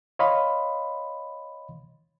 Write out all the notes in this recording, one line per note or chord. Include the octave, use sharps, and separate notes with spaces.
C#5 D#5 F5 B5 C6